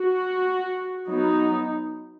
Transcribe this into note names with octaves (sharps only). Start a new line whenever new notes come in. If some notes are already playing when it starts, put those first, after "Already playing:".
Already playing: F#4
F#3 B3 D#4